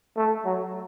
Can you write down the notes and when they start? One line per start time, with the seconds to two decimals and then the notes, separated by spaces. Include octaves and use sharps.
0.17 A3
0.45 F#3